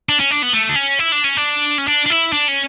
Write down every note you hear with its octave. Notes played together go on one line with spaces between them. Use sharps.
D4
C#4
D4
B3
A3
D4
C#4
E4
D4
C#4
D4
C#4
D4
D4
E4
D4
C#4